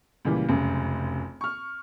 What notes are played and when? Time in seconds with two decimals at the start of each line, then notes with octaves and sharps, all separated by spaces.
0.25 C#2 A#2 E3 G3
0.48 F1 C#2 F#2
1.41 C#6 F6